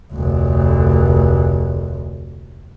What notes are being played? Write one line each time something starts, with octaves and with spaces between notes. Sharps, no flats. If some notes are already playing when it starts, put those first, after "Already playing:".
F1 D2